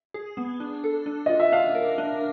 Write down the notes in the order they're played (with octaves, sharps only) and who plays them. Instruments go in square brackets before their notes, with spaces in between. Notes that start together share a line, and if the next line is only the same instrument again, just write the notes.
[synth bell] G#4
B3
D4
A4
D4
[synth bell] F4 [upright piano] D#5
[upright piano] E5
[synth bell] D4 [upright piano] F5
[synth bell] A#4
D4